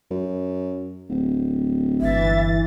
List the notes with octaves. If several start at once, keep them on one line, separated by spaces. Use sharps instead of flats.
F#2
D1
G1 E3 E5 A6